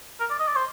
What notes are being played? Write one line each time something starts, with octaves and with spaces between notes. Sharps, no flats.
A#4
D5
D#5
D5
C5